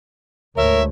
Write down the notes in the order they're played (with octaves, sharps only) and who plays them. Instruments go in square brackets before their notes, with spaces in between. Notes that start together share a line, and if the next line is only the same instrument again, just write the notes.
[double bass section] D2 G#2 [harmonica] A#4 [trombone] C#5 [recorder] E5